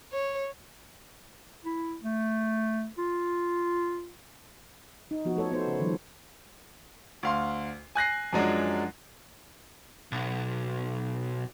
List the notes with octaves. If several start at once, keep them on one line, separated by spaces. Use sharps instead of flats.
C#5
E4
A3
F4
D#4
F3 B3 F#4
A3 A4 C#5
B3 D#4 C5
C#3
D#3 F3 G3
D2 F5 C6
G#5 F#6 A#6 C7
F#2 F3 F#3 G#3 D4
B1